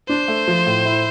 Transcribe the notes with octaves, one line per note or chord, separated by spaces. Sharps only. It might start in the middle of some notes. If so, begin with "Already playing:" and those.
D4 C5
A3
F3
A2
E4